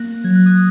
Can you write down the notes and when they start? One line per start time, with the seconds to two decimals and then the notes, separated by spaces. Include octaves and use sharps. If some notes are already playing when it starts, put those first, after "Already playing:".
Already playing: A#3 F#6 A#6
0.24 F#3 G#6
0.35 F#6
0.46 D#6 G#6